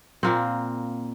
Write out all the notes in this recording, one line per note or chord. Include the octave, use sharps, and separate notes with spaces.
A#2 A#3 C4